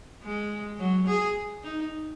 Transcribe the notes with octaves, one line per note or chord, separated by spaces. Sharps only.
G#3
F#3
G#4
D#4